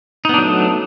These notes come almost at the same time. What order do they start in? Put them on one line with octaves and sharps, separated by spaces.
D#4 B3 D4 F#3 A3